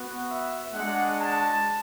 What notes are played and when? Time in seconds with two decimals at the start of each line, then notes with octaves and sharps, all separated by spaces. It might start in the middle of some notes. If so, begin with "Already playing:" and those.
Already playing: B3 F#4
0.28 E5
0.73 G#3 D4 F#4 F#5
1.20 A5